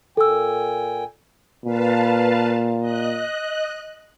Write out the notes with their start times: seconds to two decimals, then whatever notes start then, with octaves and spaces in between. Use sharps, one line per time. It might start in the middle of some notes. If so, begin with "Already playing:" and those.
0.17 A#2 A4 G5 G#5 E6
1.65 A#2 B4 F5 A5
2.80 D#5 F#6